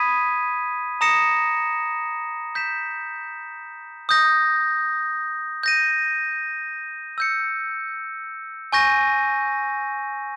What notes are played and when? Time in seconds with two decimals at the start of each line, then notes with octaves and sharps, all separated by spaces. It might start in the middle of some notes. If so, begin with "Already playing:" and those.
Already playing: B5 D#6 G#6 B6 D#7
1.01 A#5 D#6 A#6 C#7 E7
2.55 G6 B6 E7
4.09 D#6 G6 A#6
5.63 G6 A#6 D#7
7.18 E6 G6 C#7
8.72 G#5 C#6 G6 A#6 D#7